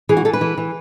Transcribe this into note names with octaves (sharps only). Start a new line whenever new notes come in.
E3 G#4
F#4
E3 A4
B4
E3
E3